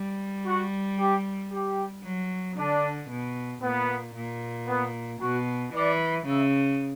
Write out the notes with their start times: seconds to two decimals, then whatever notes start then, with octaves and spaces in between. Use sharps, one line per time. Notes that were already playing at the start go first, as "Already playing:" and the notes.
Already playing: G3
0.45 F#4
0.98 G4
1.51 G4
2.03 F#3
2.56 D3 D4
3.10 B2
3.62 A#2 B3
4.15 A#2
4.67 B3
5.20 B2 F#4
5.74 E3 D5
6.26 C#3 E5